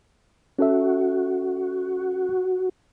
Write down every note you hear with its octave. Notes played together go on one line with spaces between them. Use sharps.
C#4 F#4 A4 E5